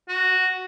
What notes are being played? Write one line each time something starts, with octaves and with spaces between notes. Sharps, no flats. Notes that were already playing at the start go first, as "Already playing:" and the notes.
F#4